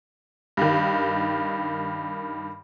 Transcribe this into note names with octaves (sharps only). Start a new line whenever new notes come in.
G2 D#3